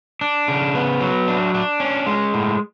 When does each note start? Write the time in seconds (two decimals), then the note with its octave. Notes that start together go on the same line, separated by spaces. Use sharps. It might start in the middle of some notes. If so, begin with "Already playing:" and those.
0.21 D4
0.48 C#3
0.75 B3
1.01 F#3
1.28 D4
1.54 D4
1.80 C#4
2.07 G#3
2.34 A2